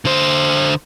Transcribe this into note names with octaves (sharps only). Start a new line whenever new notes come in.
D3 C5